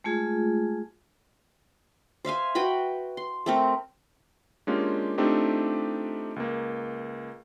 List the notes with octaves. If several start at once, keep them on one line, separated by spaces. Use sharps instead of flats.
G#3 A3 F4 G#4
C5 E5 F5 G#5
F#4 B4 G5 B5
C6
A3 C4 A#4
G#3 A#3 C#4 D4 F4 G4
A3 C4 D4 D#4 F4 G4
C#2 A#3